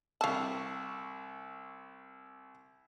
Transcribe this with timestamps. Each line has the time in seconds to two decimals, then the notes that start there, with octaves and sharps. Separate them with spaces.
0.21 C2 F5 A5 C#6 E6